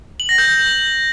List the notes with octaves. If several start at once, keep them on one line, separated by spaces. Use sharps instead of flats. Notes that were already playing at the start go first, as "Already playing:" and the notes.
F#7
A#6
G6